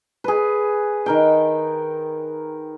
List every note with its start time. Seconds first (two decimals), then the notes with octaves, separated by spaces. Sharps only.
0.24 G#4 B4
1.06 D#3 A#4 G5